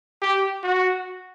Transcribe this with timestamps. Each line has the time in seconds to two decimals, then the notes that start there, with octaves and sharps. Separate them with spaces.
0.22 G4
0.63 F#4